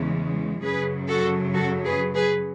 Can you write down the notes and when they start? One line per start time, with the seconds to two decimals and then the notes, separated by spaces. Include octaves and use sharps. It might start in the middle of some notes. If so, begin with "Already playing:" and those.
Already playing: E2 C#3 E3 G#3
0.63 F#2 C#3 F#3 G#4 B4
1.08 F#4 A4
1.54 F#4 A4
1.85 G#4 B4
2.14 G#4 B4